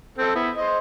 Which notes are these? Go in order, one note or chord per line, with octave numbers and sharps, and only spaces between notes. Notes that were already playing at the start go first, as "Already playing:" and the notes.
C4 A4
B3 E4
C5 D#5